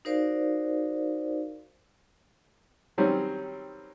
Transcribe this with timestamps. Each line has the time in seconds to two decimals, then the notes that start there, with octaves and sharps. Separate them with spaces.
0.05 D#4 F#4 A#4 C5 D5 F5
2.98 D#3 F#3 G3 C4 C#4